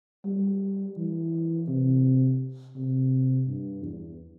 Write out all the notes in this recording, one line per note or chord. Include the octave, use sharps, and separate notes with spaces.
G3
E3
C3
C3
G2
E2